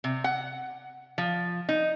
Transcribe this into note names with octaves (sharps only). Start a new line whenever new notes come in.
C3
F#5
F3
D#4